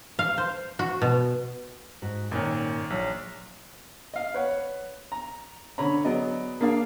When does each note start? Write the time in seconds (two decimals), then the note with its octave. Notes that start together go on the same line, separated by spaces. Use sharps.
0.19 F5
0.38 C5
0.79 F#4
1.02 B2
2.02 G#2 F#4
2.31 G#1 A#2 D#3 C#4 G#5
2.90 A#1 F#3
4.14 D#5 F5
4.34 B4 C#5 F#5
5.12 A#5
5.78 D3 C#4 C#5 A#5 B5
6.05 F#3 B3 G#4 D5 D#5
6.61 A#3 D4 G#4 D5 F5